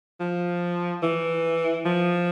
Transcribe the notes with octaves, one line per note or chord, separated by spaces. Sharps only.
F3
E3
F3